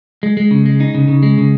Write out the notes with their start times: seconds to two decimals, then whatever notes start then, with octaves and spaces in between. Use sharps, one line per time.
0.23 G#3
0.37 G#3
0.51 C#3
0.66 G#3
0.80 D#4
0.95 C#3
1.08 C#3
1.23 G#3
1.38 C#3